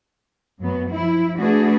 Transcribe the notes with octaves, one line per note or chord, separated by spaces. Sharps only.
F#2 F#3 B3
F3 E4
A3 D4 F#4 G#4 B4